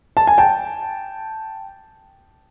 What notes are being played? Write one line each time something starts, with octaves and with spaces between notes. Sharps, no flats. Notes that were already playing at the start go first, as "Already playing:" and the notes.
A5
G#5
G5 A5